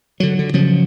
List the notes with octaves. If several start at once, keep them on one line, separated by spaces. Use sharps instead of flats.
D3 F#3
D3
C#3 F3 F#3